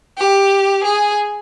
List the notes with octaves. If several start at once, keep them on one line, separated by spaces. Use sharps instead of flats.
G4
G#4